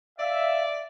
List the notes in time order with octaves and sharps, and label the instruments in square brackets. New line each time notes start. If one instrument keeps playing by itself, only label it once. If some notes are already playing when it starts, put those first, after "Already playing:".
[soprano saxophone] D5 [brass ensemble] E5 [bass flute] F5